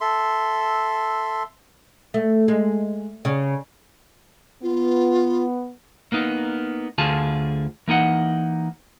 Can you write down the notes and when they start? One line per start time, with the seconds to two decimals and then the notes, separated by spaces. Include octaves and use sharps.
0.01 A4 E5 C6
2.14 A3
2.48 G#3
3.25 C#3
4.63 B3 F4
6.12 A#3 B3 D#4
6.98 D2 D3 F4 G#4 F5 A5
7.88 E3 A#3 D#4 F#5